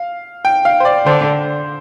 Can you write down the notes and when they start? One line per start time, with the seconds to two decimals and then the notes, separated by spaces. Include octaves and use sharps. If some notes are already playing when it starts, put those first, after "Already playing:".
Already playing: F5
0.45 G5
0.65 F5
0.80 C5
0.85 D5
1.05 D3 C5